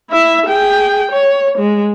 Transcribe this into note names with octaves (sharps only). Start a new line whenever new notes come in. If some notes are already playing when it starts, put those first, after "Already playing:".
E4 E5
G#4 G5
C#5
G#3